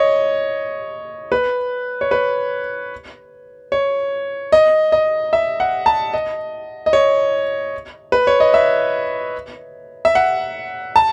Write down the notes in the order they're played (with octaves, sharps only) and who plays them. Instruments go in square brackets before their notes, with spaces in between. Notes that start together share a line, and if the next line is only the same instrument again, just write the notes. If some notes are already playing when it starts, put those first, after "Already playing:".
Already playing: [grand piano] C#5 D#5
B4
C#5
B4
C#5
D#5
D#5
E5
F#5
A5
D#5
D#5
C#5
B4
C#5
D#5
E5
E5
F#5
A5